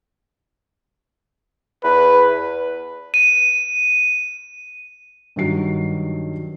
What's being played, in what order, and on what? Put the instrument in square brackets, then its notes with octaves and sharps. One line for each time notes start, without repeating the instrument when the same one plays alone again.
[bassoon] E2 [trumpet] B4
[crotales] D#7
[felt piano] G2 D#3 F#3 C7